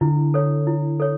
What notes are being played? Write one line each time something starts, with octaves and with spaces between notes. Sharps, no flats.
D3 E4
A4 C#5
E4
A4 C#5